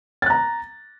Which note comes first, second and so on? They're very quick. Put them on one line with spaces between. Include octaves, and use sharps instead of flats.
A6 F#6 A#5